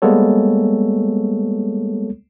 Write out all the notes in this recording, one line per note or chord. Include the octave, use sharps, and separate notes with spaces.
G3 G#3 A#3 B3 A4 C#5